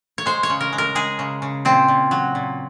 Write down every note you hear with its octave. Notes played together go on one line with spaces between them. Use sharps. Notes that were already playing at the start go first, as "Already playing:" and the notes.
C#5
G#3 C5
C#5
C#3
A#4
G#3
A#4
G#3 G#4
C#3
C#3
A#2 C4
A#2
F#3
A#2